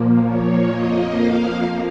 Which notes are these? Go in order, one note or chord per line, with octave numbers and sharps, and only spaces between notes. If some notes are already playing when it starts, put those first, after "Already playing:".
Already playing: A#2 F3 A#3
C#5
F2 F3 A#3 D#5
F5